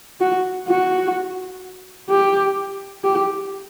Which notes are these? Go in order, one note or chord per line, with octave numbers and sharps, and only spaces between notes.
F#4
F#4
G4
G4